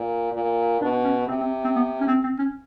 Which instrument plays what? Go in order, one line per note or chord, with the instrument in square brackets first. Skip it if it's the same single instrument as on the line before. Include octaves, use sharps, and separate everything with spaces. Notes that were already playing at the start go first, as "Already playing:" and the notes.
Already playing: [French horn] A#2
A#2
[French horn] B2 [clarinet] D4
[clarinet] C#4
[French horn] C3 [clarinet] C4
[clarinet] C4
C4
B3
C#4
C4
C4
C#4